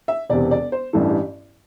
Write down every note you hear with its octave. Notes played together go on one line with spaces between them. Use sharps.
E5
E1 E2 C3 D5
D5
C5
A1 G2 E3 A4
G4